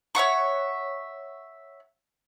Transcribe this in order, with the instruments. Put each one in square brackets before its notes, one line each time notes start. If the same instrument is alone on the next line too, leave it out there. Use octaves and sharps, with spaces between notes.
[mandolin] C#5 E5 F#5 C#6